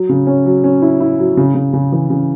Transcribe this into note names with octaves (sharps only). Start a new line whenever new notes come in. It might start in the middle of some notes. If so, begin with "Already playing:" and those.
Already playing: F#3
C#3
C#4
F#3
C#4
E4
E4
F#3
C#3
C#3
C#3
E3
C#3